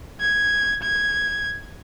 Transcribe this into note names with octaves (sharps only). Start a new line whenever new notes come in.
G#6
G#6